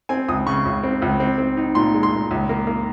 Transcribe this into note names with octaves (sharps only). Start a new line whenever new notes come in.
C4 G#5
C#2 D#6
C#3 C#6
C#2
C4
C#2
C4
C4
D#4
A#2 C6
G#3
C6
A#2
C#2
A#3
A#3